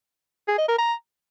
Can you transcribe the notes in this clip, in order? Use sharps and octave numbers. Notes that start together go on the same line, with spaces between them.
G#4
D#5
A#4
A#5